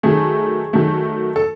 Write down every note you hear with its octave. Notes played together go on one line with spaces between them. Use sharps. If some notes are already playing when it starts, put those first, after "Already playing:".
D#3 F#3 A3 G#4
D#3 F#3 A3
A4